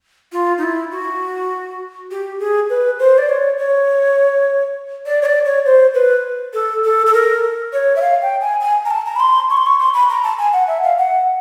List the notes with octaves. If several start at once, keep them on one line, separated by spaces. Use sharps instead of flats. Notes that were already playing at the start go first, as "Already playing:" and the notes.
F4
D#4
E4
F#4
G4
G#4
B4
C5
D5
C#5
C#5
D5
C#5
D5
C#5
C5
B4
A4
A4
A4
A#4
C#5
E5
F5
G5
G#5
G#5
A#5
A5
A#5
B5
C6
C#6
C6
C#6
C6
B5
A#5
A5
G#5
F#5
E5
F5
F#5